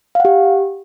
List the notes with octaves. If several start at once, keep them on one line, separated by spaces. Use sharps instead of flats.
G4 F5 F#5